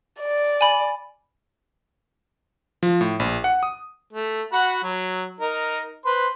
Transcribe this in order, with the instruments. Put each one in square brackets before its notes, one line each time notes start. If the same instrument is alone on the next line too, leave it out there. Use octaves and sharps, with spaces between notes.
[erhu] D5
[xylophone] G#5 B5
[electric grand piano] F3
A2
A#1
F#5
D#6
[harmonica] A3
F#4 F#5 B5
F#3
D#4 A#4
B4 C5 C6